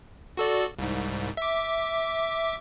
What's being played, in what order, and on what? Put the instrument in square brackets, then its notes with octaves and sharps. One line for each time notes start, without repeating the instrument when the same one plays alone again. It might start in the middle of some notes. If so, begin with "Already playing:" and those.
[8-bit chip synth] F#4 A4 D5
C2 G#2
E5 D6